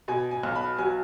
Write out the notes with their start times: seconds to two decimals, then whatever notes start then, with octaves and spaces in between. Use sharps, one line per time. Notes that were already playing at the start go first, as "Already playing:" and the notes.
0.08 B2 G#5
0.31 G#5
0.43 B1
0.55 B5
0.78 F#3 G#5